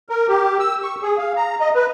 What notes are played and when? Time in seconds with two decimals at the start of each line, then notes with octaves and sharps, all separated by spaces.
0.09 A#4
0.28 G4
0.60 E6
0.83 C#6
1.03 G#4
1.18 F5
1.36 A#5
1.60 D#5
1.75 B4